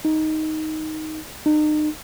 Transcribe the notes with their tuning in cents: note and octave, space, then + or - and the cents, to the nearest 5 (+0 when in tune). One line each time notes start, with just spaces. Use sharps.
D#4 +5
D#4 -40